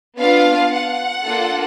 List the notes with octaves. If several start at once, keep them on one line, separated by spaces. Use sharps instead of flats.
B3 D4 F4 F5
F#5
A#3 D4 F4 A4